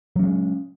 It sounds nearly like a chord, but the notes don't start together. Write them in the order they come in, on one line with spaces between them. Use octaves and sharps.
F#3 C#4 G#3